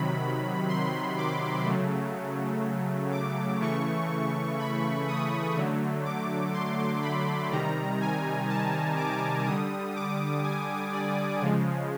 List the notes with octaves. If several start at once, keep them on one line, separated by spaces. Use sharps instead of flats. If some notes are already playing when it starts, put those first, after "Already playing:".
Already playing: C3 D#3 F#3 B5
C6
D6
C#3 F#3 A3
D6
C#3 E3 A3 C#6
B5
D#6
D3 F#3 A3
D6
C6
B5
C3 D#3 G3 A#5
G#5
A5
D6
D3 G3 D#6
D6
G#5
D5
C#3 F3 G#3